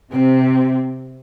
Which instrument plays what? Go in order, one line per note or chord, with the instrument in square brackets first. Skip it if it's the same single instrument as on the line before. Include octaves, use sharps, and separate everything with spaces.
[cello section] C3 [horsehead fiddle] C4